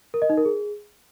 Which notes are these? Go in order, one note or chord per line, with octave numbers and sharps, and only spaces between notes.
A#4
D#5
D#4
A#4
G#4